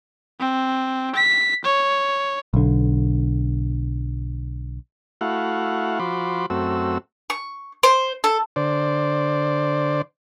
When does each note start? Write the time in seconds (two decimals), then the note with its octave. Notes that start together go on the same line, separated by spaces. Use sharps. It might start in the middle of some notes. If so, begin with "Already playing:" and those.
0.40 C4
1.15 B6
1.65 C#5
2.54 B1 D3
5.21 A3 E4 F#4 F5 F#5
5.99 F3 F#4 B5 C6 D6
6.50 F#2 A3 C4 F#4 E6
7.30 C#6
7.83 C5
8.24 A4
8.56 D3 C5 D5